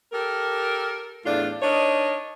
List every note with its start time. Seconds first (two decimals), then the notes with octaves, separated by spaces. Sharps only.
0.12 G4 A4 A#4
1.26 E2 A2 D4 F4
1.62 D4 D#4 A#4 C#5 D#5